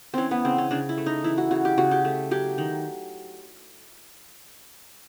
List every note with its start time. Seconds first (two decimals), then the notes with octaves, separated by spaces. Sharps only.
0.14 E3 C4 C#4
0.31 B3
0.45 C#3 C4
0.58 C#4
0.71 C#3 D4
0.89 E4
0.98 A3
1.06 D#4
1.24 E3 E4
1.37 F#4
1.51 C#3 F#4
1.65 G4
1.78 C#3 F#4
1.91 G4
2.05 A3
2.31 F#3 G4
2.58 D#3